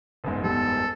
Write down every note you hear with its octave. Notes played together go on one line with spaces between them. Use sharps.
F#1 E2 G#2
G3 B3 A4